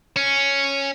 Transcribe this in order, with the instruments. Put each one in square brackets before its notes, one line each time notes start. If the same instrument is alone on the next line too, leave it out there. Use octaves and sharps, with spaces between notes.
[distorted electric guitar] C#4